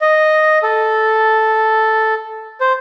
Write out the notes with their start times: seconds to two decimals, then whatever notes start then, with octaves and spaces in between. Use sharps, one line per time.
0.01 D#5
0.63 A4
2.61 C5